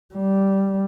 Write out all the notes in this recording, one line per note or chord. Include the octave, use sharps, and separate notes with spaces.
G3